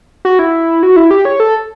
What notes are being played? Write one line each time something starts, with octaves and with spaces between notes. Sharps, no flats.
F#4
E4
F#4
E4
G4
C#5
A4